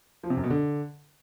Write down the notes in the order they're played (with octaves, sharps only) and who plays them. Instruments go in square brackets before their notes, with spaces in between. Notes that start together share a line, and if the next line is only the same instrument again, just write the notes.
[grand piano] F3
C3
F#2
B2
D3